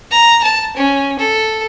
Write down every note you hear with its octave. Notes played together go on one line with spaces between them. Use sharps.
A#5
A5
C#4
A4